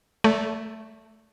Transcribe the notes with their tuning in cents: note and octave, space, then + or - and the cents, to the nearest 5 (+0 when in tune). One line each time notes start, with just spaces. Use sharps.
A3 +0 D5 -40